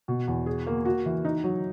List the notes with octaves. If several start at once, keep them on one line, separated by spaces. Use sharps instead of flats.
B2
E2
G#4
A#3
F#4
E3
D#4
F#3